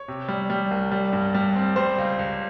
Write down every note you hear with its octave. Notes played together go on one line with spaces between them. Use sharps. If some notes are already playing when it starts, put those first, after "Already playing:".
Already playing: C#5
C3
G3
G3
C2
G3
G2
G3
C4
G3 C5
C#2
C#2